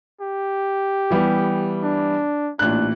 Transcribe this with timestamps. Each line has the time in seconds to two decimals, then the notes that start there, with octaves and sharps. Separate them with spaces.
0.21 G4
1.10 E3 G3 B3
1.83 D4
2.59 A1 A#2 D4 F#6